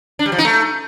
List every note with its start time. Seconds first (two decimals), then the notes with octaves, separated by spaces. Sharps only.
0.19 D4
0.26 G3
0.32 F3
0.38 D#4
0.45 A3